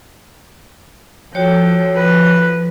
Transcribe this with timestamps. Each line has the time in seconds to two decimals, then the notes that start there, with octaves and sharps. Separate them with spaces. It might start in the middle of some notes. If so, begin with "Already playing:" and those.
1.35 F3 F#4 A4 C#5 G5
1.95 B4